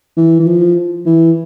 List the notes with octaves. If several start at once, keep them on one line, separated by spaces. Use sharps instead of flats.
E3
E3
F3
E3